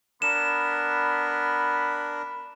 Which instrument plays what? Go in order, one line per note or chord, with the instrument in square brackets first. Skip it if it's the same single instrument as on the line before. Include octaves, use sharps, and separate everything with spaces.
[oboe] B3 [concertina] D4 A#4 [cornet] B5 [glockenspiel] E7